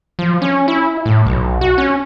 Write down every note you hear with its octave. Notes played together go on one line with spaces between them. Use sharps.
F3
C#4
E4
A2
B1
F#4
C#4